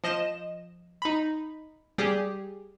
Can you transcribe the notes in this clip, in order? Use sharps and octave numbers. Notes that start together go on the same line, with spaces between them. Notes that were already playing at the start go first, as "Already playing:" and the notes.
F3 D#5 E7
D#4 B5
G3 G4 G#4